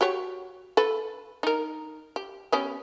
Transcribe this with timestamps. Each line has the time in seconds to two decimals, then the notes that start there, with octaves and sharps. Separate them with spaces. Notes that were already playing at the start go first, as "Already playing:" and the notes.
0.01 F#4 G4 C#5
0.77 A4 B4
1.43 D#4 A#4
2.16 G4
2.52 B3 C#4 G4